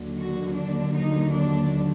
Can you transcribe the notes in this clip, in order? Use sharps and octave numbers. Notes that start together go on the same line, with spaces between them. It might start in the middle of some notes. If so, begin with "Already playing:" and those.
Already playing: D#2 D3 F#3
F#4
D4
D#4
D4